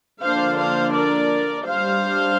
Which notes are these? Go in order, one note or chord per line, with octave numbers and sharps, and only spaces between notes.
D3 F3 A#3 D4 C5 F5
C5 F5
A#4 D5
G3 D4 C5 F5